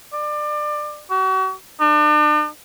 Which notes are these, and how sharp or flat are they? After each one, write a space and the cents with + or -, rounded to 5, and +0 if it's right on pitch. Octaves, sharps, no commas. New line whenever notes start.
D5 +25
F#4 +40
D4 +40